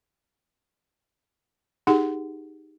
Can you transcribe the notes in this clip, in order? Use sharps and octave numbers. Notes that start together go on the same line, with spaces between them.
D#4 G4 G#4 F#5